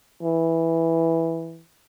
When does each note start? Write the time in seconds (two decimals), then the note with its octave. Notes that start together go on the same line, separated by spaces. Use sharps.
0.23 E3